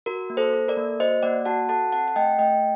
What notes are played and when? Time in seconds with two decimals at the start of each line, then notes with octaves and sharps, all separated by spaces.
0.06 F#4 A#4
0.30 A#3
0.37 A4 C5
0.53 A4
0.68 A#4 D5
0.77 A#3
1.00 F#4 C5 D#5
1.23 A#3 D5 F#5
1.45 F#4 F#5 A5
1.69 A4 F#5 A5
1.92 C4 F#5 A5
2.08 F#5
2.16 A3 D#5 G5
2.39 A3 D#5 G5